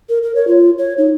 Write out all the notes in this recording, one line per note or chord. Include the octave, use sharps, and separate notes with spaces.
A#4
A#4
C#5
F4
C#5
D#4